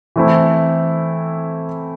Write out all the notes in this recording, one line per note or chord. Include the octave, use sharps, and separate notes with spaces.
E3 A3 C4 E4